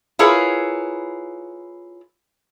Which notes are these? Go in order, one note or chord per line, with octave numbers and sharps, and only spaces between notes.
E4 F4 G#4 A#4 B4 C#5